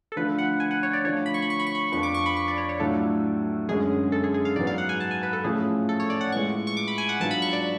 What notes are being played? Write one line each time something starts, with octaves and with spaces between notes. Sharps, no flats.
A4
D3 F3 A3 D4 F4 B4
F#5
G#5
F#5
C#5
D5
D3 F3 A3 F4 C#5
B5
C#6
B5
C#6
B5
C#6
B5
F2 F3 B3 D4 C#6
D6
C#6
B5
C#6
D5
C#5
C#5
A2 F#3 A3 D4 F4 A4
F#2 D3 G#3 C#4 G#4
A4
G#4
G#4
F5
G#2 F#3 B3 D5
F5
F#5
G#5
A5
G#5
B4
A4
A2 F3 A3 C#4 F4 G#4
A4
C#5
D5
F#5
A2 G#3 B3 F4 C#6
C#6
D6
B5
G#5
F#5
G#2 F#3 B3 D4 F4 A5
B5
C#6
D5